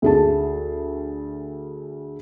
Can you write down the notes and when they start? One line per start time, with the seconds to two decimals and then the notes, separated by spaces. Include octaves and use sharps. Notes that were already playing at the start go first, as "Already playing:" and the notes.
0.02 D2 G#4 A5